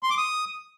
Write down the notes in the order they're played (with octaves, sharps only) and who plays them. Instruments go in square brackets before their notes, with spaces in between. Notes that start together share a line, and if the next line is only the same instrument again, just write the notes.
[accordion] C6
D6
D#6